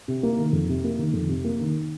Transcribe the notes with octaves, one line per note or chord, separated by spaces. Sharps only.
C3
A#3
D#3
F2
C3
A#3
D#3
F2
C3
A#3
D#3